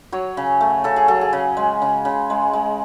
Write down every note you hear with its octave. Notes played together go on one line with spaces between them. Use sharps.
F#3 C#5
C#3
A3
C#3 A4
G#4
F#3 A4
G#4
C#3
G#3
C#3
C#3
G#3
G#3